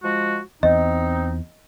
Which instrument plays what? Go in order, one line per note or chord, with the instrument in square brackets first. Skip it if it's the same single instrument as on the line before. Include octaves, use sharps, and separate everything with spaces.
[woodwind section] F3 G#3 F#4
[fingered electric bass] E2 [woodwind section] C4 D#4 [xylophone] D#5